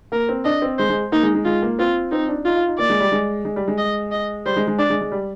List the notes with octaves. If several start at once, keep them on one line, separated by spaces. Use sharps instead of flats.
A#3 A#4
C4
D4 D#5
C4
G#3 C5
G#3
A#3 D#4
G#3
G#3
G#3 F4
A#3
C4 F4
C4 D#4
D4
D#4 F4
F4
D#4
A#3 D5
G#3
G3
G#3
G#3
G3
G#3
D#5
D#5
G3 C5
G#3
G#3
D4 D5
G#3
G#3
G3